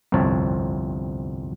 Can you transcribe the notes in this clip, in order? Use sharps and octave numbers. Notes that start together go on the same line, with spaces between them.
G1 C2 F2 C4 C#5 A5